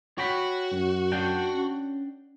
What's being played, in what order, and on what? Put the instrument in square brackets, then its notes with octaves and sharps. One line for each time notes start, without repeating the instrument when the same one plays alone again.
[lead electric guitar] F#4 [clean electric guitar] C#5 G5 B5
[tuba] F#2
[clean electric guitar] D4 F#5 G5
[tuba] C#4